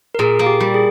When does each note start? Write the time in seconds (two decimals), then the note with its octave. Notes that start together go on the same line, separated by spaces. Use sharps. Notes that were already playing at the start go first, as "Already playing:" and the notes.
0.15 A#4
0.19 A#2 G#4
0.39 A#3
0.46 G4
0.60 G3
0.74 G#4